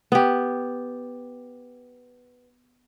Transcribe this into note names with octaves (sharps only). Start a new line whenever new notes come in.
B3 G4